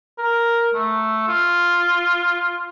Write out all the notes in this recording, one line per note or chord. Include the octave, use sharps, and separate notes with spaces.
A#4
A3
F4